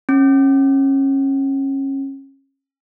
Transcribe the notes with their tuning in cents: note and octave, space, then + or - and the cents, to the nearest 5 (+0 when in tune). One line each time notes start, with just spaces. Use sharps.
C#4 -25